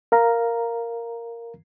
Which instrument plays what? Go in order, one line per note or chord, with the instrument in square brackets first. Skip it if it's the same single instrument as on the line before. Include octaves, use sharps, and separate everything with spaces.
[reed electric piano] A#4 F5 A#5